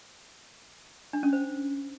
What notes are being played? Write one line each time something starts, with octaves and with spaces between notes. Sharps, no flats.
D4
C#4
C5